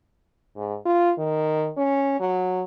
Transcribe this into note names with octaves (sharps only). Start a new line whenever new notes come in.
G#2
F4
D#3
C#4
F#3